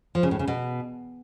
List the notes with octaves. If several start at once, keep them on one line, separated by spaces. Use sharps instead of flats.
F3
C#3
A2
C#3
B2